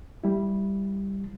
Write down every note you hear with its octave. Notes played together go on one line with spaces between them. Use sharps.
G3 E4